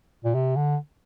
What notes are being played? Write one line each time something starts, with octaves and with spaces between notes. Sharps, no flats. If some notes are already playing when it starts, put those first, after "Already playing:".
A#2
C3
D3